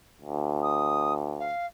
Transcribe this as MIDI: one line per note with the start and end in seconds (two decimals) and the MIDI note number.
0.22 1.54 38
0.63 1.13 87
1.39 1.66 77